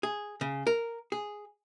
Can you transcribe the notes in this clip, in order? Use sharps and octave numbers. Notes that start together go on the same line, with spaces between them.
G#4
C#3
A#4
G#4